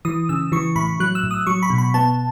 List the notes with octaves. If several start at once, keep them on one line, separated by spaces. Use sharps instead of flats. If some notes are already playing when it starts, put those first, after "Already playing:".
E3 D#6
C#3 E6
E3 C#6
A2 B5
F#3 F#6
E6
A2
D#6
F#3 C#6
B5
B2
B5
B3 A5